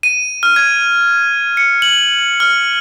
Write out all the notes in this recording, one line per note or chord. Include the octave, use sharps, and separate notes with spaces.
D#7
F6
G#6
C#7
F#7
F6